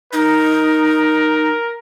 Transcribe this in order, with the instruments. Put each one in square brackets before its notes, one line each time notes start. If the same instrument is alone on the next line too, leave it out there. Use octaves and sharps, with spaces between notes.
[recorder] D#4 [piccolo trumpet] A#4